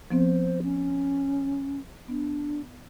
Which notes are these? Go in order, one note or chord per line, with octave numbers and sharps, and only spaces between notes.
F3 B3 C4 C5
C#4
B3 D4